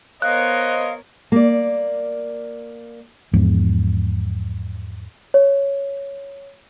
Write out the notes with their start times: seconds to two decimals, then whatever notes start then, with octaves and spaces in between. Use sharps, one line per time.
0.22 B3 A#4 C5 C#5 D#5 F5 F#6
1.32 A#3 D5
3.33 E2 G#2 F3
5.34 C#5